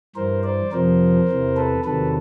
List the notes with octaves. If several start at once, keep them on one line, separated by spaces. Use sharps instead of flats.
G2 E3 A#4 C5
C5 D5
F2 C3 F3 A#4 C5
E2 C3 E3
A4 B4
E2 C3 D#3 F#3 A4 B4